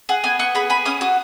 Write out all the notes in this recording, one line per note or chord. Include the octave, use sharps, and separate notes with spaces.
G#4 F#5
B3 G#5
B3 C#6
G#4 B5
G#4 B5
C#4 D#6
F#4 D#6